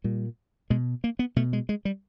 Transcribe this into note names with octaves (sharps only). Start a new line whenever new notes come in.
A#2 G3
B2 G#3
A#3
B3
B2 A3
G#3
G#3
G3